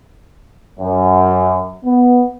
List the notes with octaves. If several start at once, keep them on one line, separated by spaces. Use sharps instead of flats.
F#2
B3